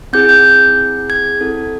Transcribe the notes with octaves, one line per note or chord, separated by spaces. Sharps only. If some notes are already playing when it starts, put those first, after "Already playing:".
C4 E4 G#4 G6
G6
G#6
C4 E4 A4